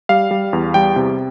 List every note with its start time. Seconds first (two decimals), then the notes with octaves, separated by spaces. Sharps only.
0.09 G3 F5
0.31 G3
0.53 E2
0.74 G3 G5
0.96 C3